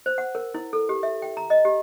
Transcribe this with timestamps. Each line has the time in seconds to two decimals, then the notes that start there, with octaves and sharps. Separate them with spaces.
0.06 C5
0.18 F#5
0.35 A#4
0.54 E4
0.73 A4
0.89 G4
1.03 E5
1.22 G5
1.37 A#5
1.50 D#5
1.65 G4